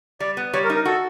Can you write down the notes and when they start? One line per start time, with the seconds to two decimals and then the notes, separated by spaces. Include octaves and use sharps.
0.20 G3 D5
0.37 B3
0.54 G3 C#5
0.64 A#4
0.70 D#4
0.75 A#4
0.85 F#4 A4